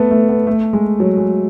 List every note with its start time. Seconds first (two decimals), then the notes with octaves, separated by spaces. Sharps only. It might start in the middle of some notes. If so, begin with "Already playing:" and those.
Already playing: A3 B3
0.11 A3
0.29 B3
0.47 A3
0.73 G#3
1.00 F#3
1.17 G#3